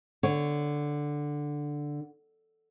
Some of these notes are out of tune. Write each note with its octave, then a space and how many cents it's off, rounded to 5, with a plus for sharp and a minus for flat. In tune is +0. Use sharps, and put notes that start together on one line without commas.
D3 +0 C#5 +0